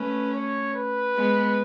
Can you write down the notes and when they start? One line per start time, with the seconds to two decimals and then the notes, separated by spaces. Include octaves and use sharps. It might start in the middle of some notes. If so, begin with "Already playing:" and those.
Already playing: A3 C#4 B4
0.33 C#5
0.74 B4
1.15 G#3 B3